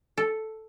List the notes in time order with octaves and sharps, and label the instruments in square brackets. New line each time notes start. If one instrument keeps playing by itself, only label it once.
[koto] A4